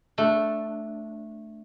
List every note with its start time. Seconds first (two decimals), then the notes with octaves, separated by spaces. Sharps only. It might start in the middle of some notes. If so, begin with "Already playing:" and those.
0.18 A3 D4